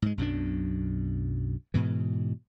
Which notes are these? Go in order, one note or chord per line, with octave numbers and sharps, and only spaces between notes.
G#2 G#3
B1 F#2 B2 D4
G#2 B2 E3